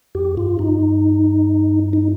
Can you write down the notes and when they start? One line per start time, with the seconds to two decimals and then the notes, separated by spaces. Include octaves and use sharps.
0.15 F2 G4
0.37 G2 F4
0.59 G2 D#4
1.93 D#4